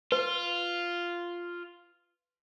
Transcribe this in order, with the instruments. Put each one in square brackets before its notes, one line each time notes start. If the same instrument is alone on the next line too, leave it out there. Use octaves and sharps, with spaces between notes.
[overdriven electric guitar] F4 [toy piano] B4